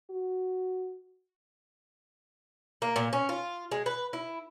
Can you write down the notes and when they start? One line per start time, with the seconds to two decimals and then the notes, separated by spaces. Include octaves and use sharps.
0.10 F#4
2.82 A#3
2.96 A#2
3.13 C#4
3.29 F4
3.72 G#3
3.86 B4
4.13 E4